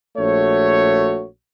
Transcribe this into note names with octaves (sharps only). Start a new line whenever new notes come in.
A#1 A3 F#4 C#5